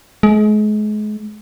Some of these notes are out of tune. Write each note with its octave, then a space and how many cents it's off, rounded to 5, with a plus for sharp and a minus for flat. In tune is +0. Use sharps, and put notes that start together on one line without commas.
G#3 +35